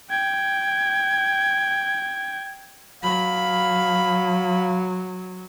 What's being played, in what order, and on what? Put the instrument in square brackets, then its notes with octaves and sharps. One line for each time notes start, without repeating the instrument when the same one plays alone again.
[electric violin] G5 G#6
[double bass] F#3 [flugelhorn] F5 [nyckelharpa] B5